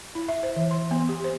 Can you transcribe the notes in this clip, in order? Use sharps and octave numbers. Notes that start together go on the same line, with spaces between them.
E4
E5
C5
E3
C6
B3
G4
C5